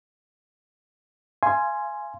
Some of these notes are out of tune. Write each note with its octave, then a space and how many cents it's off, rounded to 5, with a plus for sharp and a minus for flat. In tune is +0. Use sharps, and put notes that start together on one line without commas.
F5 -30 G#5 +5 C6 +0